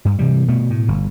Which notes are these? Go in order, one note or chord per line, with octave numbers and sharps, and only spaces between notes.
G2
C3 E3 G3
B2 A3
A2
G1